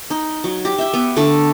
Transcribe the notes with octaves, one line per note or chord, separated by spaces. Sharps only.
D#4
F#3
G4
E5 G5
B3
D3 A3 A4